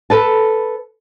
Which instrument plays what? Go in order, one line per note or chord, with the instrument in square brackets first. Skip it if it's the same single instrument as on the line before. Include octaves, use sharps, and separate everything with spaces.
[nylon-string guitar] A4 B4 A5